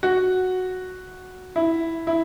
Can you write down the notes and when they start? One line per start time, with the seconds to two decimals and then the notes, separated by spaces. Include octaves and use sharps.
0.03 F#4
1.56 E4
2.07 E4